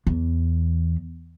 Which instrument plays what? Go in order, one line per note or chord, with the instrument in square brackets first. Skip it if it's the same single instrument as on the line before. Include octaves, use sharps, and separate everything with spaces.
[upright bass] E2